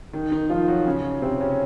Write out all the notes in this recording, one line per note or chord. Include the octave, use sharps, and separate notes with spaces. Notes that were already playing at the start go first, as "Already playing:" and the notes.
D#3 D#4
D#3 D#4
F3 F4
F#3 F#4
C#3 C#4
C3 C4
C#3 C#4